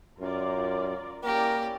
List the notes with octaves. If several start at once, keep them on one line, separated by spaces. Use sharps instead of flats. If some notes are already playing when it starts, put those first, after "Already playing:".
F#2 F4 A#4 D5
A#3 C#4 E4 G4 A#4 D5